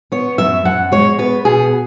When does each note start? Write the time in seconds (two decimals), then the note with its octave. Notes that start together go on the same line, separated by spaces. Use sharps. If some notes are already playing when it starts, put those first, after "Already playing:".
0.12 B3 C#5
0.38 F#2 E5
0.65 F#2 F#5
0.92 G#3 C#5
1.18 B3 B4
1.45 B2 G#4